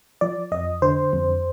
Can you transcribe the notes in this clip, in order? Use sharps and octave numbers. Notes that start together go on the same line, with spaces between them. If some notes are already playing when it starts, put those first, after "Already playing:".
F3 D5
F2 D#5
D3 C5
F2